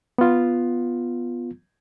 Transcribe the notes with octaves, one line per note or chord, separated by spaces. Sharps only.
B3 F4